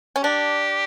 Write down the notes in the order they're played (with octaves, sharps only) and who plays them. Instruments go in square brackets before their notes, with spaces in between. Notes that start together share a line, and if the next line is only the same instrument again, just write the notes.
[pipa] C#4
[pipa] D4 [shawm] G4